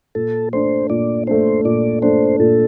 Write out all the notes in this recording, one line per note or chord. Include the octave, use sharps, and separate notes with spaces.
A#2 A4
A3 D4 C5
A#2 D5
A3 D4 C5
A#2 D5
A3 D4 C5
A#2 A4